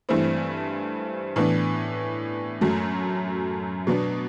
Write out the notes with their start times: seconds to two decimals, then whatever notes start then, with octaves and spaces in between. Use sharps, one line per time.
0.09 G2 E3 A3 C4 E4
1.36 A2 E3 B3 D4
2.61 F#2 F#3 A3
3.87 B2 F#3 B3 D4